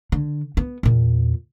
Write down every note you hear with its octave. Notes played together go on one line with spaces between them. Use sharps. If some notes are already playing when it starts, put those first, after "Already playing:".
D3
B3
E2 A#2